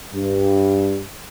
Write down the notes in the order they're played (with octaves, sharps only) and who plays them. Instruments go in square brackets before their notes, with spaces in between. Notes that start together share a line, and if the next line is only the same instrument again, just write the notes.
[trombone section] G2